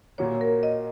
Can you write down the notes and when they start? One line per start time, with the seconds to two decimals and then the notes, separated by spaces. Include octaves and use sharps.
0.18 A#2 F#3 A#3 C#5
0.41 A#4
0.63 D#5